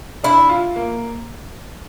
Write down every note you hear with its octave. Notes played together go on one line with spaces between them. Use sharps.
D4 E4
F4
A#3